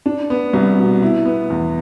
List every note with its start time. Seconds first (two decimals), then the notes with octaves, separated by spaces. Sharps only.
0.06 D4
0.30 B3
0.53 C2
0.78 B2
1.02 E4
1.25 B3
1.50 E2